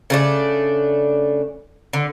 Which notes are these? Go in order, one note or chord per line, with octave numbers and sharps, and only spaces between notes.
C#3 A3 D4
D3